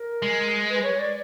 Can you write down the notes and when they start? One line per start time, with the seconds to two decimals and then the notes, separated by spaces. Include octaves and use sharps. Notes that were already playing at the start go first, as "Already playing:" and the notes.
Already playing: A#4
0.22 G#3
0.69 B4
0.84 C#5
0.99 D5